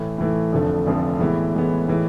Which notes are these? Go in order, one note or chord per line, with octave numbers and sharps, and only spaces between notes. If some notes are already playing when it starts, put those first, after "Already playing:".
Already playing: A2 E3 A3
A2 E3 A3
F1 F2 D3 F3 A3
F1 F2 D3 F3 A3
A2 E3 G#3 B3
A2 E3 G#3 B3
A2 E3 G#3